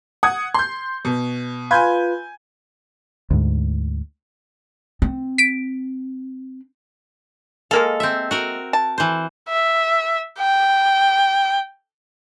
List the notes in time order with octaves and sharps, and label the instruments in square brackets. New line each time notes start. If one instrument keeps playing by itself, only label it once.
[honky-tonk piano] F#5 D#6 G#6
C6 G6
B2
[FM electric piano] F4 B4 [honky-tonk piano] G#5 G6 G#6
[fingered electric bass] D2 G#2
[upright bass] C4
[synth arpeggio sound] B6 D7
[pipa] G#3 A#3 F5 [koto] A4
[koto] C4 E5
F#4 A#4
[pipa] A5
[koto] E3 C5
[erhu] E5
G5